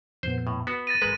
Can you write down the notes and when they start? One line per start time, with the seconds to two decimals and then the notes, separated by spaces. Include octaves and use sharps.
0.23 F2 A#2 B3 C5
0.47 A2
0.67 B3 F#4 B6
0.87 A6 A#6 D#7
1.02 G#1 G#3 A#4 B4